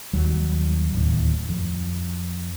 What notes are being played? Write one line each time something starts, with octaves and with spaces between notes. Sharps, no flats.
D#2 F#3 G3
D1 D#2 A2
F2